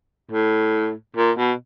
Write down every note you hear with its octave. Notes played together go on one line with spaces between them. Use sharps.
A2
A#2
B2